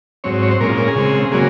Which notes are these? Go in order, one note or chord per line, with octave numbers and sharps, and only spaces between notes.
G#2 F#3 C4 C#5
C#5
C5
A#2 G#3 C#4 A#4
F4
A#4
G#4
C#3 G#3 C4
C#3 F#3 A#3 G#4